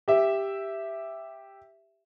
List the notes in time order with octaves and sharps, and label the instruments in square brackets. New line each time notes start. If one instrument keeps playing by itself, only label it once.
[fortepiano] G4 E5